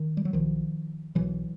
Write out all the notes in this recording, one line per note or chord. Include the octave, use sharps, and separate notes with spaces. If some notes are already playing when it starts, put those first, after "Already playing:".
Already playing: D#3
G3
F#3
B1 B2 D#3 F3
B1 B2 E3 F#3